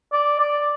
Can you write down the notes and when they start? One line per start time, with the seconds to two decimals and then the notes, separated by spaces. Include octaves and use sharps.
0.13 D5
0.39 D5